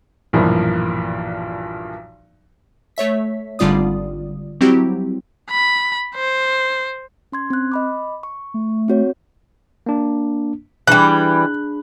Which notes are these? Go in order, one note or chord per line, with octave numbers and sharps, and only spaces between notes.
B1 G2 A#2 E3 F3 A#3
A3 C#5 E5 B6
G#1 D3 G3 F4 D5 D#6
F#3 G3 C4 E4 F#4 G4
B5
C5
C#4 C6 G#6
C4 F#6
D#5 B5 D6
C#6
A3
C4 F#4 C#5
A#3 D4
E3 G3 D4 G#4 B5 F#6